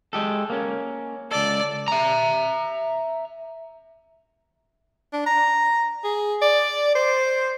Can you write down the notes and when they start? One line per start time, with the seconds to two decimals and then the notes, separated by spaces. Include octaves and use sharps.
0.13 G#3 G4 A4
0.50 A#3 C#4
1.31 C#2 A4 D5
1.88 E5 A#5
5.13 D4
5.26 A#5
6.04 G#4
6.42 D5
6.95 C5